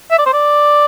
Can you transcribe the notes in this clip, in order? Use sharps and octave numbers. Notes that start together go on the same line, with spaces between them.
E5
D5
C5
D5